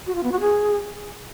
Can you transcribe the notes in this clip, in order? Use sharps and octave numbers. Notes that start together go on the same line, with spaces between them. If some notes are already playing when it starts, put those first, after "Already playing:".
F#4
F4
B3
F#4
G#4